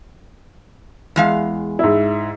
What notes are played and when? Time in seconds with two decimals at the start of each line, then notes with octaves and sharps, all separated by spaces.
1.16 E2 G#3 F5
1.79 G#2 E4